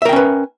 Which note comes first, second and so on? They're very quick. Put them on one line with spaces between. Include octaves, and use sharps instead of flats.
E5 A#4 G5 C#4 B4